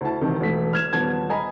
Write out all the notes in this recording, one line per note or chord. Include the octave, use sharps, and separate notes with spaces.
D2 E4 A5
E1 C3 D#3
E1 A3 B6
F6 G#6 E7
D#1 B3 A5 G#6
D#5 G#5 A#5 B5